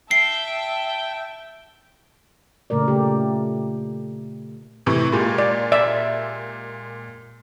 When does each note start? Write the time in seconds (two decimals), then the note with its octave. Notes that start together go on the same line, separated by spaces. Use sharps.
0.11 E5 G5 A5 C7
2.70 A#2 C#3 A3 A#4 D5
2.88 A3 G4
4.86 A2 C3 E3
5.12 A#2 G#3 G4
5.38 D5
5.72 D5 E5